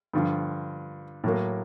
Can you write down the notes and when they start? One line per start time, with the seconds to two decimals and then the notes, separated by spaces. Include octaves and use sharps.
0.13 G2 D3 F3
1.24 A2 F#3 A#3